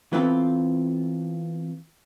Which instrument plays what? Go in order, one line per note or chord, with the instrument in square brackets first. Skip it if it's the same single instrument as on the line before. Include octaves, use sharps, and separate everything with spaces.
[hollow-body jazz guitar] E3 B3 C4 F4 A4